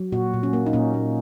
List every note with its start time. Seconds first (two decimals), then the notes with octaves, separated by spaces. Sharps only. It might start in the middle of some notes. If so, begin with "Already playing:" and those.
Already playing: F#3
0.12 A#2 F#4
0.34 A#2
0.43 C#4
0.53 A#3
0.66 D#4
0.73 A#2 C#4
0.94 A#3